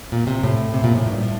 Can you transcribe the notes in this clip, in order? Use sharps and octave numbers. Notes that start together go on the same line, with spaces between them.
A#2
C3
A2
C3
A#2
A2
G2
A2